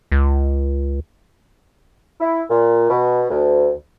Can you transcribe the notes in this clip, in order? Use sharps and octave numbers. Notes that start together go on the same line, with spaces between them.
C#2
E4
A#2
B2
D2